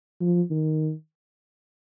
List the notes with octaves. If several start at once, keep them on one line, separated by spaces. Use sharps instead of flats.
F3
D#3